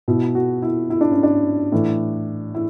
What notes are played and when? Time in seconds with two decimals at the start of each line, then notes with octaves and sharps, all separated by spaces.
0.08 B2 E4
0.35 F#4
0.62 E4
0.90 E4
1.01 D4
1.12 C#4
1.23 D4
1.72 A2 E3
2.55 E4